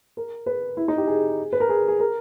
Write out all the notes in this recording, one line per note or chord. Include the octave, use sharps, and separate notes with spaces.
A#4
B4
E4
D#4
G4
G#4
B4
A#4
G#4
G#4
A#4